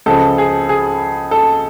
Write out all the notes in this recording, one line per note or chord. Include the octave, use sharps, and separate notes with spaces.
C#2 C#3 F3 A4
G#4
G#4
A4